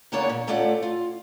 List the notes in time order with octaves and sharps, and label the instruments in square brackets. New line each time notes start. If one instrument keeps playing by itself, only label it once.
[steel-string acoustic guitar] E2 C#3 A#3 B3 D4 C#5
A#2
D2 A3 C#4 F4 D5 F#5
F4